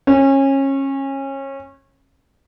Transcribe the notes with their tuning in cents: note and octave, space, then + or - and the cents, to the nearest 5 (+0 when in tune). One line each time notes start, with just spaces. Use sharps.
C#4 -25